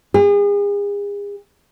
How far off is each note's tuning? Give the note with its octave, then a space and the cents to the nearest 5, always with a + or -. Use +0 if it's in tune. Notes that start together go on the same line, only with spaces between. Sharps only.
G#4 -40